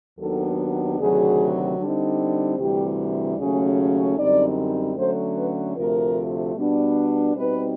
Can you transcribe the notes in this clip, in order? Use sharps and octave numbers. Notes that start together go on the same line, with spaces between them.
D#2 D#3 F#3 B3 D4 A4
D2 C3 D#3 F#3 G#4
D3 G3 C4 D#4
D2 C3 E3 G3 G4
D#2 C#3 F#3 A3 C#4 G#4
F#2 D3 G3 C4 D#4 D5
D3 F#3 A3 C#4 C5
B4
D2 C3 F3 A3 A#4
B2 G3 B3 D4
B2 G3 C4 D#4 B4